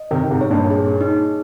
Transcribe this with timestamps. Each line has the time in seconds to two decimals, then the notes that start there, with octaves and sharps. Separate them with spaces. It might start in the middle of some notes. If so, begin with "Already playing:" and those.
Already playing: D#5
0.11 C3 D#3 D#4
0.31 G#2 C3
0.41 C#5
0.50 G2 A#2
0.71 G#4
1.01 D#4